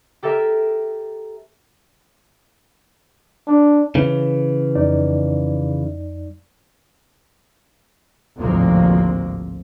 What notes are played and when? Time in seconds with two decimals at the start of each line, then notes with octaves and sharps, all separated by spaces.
0.23 G4 A4 A#4 E5
3.47 D4
3.95 C#3 E3
4.75 F2 D#4 D5
8.37 G#1 D2 A2 C3 F3 A#3